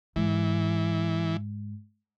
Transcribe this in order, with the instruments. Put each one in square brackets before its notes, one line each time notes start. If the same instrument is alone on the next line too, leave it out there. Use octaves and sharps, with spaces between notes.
[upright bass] G#2 [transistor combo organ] E3